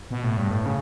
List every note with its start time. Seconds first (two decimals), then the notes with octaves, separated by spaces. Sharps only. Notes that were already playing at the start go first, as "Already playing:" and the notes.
0.11 B2
0.24 A2
0.37 G2
0.51 A2
0.66 C#3